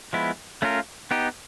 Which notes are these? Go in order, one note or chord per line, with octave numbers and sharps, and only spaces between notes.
F3 G#3 B3 E4
A3 C#4 F4 A#4
B3 D#4 G4